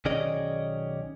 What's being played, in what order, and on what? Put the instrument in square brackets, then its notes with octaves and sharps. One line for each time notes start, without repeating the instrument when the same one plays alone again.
[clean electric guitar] B1 D#3 C#4 G#4 D5 D#5